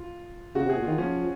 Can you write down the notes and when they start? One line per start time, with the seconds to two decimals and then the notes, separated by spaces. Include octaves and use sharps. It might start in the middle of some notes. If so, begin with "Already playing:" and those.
Already playing: F4
0.55 C#3 F#4
0.65 C3
0.69 G#4
0.76 A#2
0.84 D#3 F4
0.98 F3 C#4